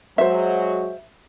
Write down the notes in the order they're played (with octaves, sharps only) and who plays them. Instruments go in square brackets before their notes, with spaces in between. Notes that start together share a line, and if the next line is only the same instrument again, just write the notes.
[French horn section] F#3 G#3 F#4 [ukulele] C5 E5